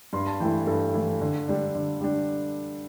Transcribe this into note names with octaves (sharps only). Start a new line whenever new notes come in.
G2 C6
A5
E3 A3 E4 G5
G2 A4
E3 A3 E4
D3
G3 D4
D3
G3 D4